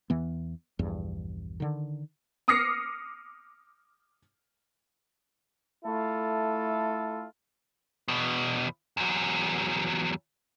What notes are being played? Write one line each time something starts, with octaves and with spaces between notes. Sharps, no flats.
E2 E3 B3
A#1 E2 G2
D3 D#3
D6 D#6 F6 A#6 C7 C#7
A3 E4 F4 A4
E2 B2
E2 F#3